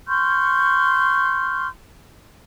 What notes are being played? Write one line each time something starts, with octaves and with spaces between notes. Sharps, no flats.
C6 C#6 F6 G6